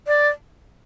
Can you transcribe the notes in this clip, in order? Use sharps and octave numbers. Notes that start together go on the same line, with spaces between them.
D5